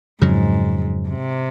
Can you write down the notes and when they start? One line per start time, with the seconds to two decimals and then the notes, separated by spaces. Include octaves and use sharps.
0.22 F2 G#2 C#3 F#3
1.08 C3